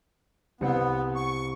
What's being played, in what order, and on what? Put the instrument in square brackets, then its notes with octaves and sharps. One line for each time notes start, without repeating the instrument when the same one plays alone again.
[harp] C2 G6 C#7 [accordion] B3
[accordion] C#6